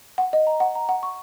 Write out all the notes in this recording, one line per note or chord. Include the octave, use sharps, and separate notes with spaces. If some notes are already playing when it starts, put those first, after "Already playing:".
F#5
D#5
A#5
F#5
A#5
F#5
C#6